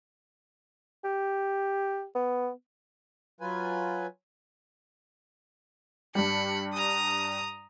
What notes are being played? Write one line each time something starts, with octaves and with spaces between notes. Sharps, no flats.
G4
B3
F#3 F4 B4 G#5
G2 G3 B5 C#7
A#5 D#6